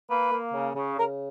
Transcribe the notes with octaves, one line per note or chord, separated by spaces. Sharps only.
A#3 B4
A#3
C#3
C#3
C#3 A#4